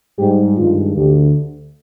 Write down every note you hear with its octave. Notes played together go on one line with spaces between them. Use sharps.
G#2 G3 G4
G2 D#3 G#3 F4
D2 D3 G4